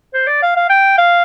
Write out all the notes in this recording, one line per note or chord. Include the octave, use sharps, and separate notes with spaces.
C5
D5
F5
F5
G5
F5